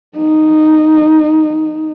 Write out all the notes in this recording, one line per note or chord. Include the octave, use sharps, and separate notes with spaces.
D#4